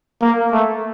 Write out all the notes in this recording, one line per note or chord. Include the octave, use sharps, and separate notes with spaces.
A#3
A3